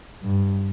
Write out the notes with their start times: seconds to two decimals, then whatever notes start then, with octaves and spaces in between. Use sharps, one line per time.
0.23 G2